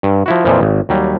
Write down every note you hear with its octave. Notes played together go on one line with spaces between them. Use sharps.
G2
F3 E4 F#4
F2 A#2 E3 F3
G#1
D#2 F#3 G3